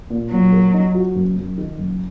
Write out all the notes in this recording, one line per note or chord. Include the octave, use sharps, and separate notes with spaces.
A#2
A#2 F#3
A#3
D#4
F#4
F#1
F#2
D#3
F#1